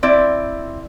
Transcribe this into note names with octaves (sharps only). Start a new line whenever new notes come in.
C4 E4 D5